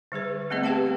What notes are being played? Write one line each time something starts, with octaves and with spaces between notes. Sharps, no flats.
D3 G3 G#4 B4
G3 A3 B3 C4 G#4 D#5
G4 B4 F5 G5 A5